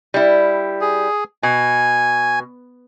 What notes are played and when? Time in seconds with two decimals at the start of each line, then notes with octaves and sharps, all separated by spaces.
0.14 G3 E4
0.81 G#4
1.43 B2 G#5